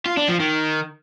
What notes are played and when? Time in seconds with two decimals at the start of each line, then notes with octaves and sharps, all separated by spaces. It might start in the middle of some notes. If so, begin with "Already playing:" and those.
0.06 F4
0.17 D4
0.28 F3
0.40 D#3